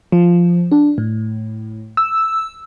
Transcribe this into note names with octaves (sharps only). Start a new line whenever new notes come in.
F3
D4
A2
E6